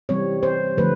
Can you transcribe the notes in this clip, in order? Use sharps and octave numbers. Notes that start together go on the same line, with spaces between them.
C3 E3 G3 C4 C#5
C5
D3 F3 A3 B4